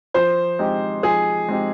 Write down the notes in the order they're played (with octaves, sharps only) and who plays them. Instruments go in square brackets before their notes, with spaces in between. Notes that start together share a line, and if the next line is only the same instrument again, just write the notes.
[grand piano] F3 [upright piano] C5
[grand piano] G#3 C4 D#4 G4
[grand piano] F3 [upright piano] G#4
[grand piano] G#3 C4 D#4 G4